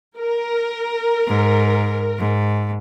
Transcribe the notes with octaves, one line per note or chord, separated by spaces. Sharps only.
A#4
G#2
G#2